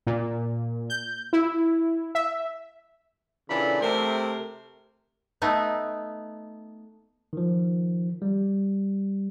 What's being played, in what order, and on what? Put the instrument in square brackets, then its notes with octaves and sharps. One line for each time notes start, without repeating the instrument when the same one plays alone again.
[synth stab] A#2
G6
E4
E5
[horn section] A#2 C#3 E3 D4 A4 B5
C3 A3 G4 A#4 C5
[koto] A3 B3 D#4
[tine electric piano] D#3 F3
G3